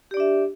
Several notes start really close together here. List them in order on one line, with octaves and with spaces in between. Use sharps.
G4 D5 D4 E5